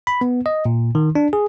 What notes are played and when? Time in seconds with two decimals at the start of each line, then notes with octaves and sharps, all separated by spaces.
0.07 B5
0.21 B3
0.46 D#5
0.65 A#2
0.95 D#3
1.15 D4
1.33 G#4